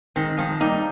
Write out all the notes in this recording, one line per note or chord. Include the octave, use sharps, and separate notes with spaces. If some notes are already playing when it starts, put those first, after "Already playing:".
D#3 G#3 C4
D#3 F3 G#3
G3 A#3 D#4